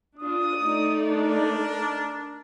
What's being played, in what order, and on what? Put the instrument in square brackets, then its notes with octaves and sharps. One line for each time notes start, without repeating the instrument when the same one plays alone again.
[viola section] D4 F4 [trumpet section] D#6
[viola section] A3 D#4 D5
[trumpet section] D4 A#4